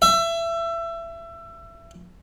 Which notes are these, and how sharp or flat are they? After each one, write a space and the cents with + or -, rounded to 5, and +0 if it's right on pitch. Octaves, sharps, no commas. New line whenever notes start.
E5 +25